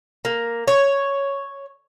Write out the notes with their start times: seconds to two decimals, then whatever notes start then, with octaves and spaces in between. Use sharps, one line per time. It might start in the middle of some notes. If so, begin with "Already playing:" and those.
0.25 A#3
0.68 C#5